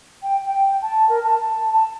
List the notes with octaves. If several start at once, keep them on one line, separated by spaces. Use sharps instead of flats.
G5
G5
A5
A#4
A5
A5